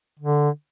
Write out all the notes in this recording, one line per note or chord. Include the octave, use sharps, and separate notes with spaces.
D3